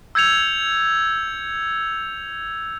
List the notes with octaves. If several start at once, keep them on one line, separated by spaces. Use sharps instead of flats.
E6 G6 G#6 C#7 F7